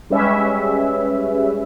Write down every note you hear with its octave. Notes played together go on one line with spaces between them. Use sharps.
G3 G#3 C#4 B4 E5